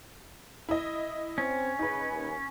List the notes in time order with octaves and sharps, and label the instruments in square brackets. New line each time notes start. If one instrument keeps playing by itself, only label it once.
[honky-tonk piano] E4 D#5
[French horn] C4 [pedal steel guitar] C#4
[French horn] C#3 [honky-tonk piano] D#4 B4
[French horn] D#2